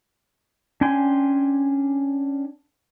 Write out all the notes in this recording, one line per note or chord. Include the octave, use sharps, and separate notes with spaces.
C#4 D4 G5 G#5 C6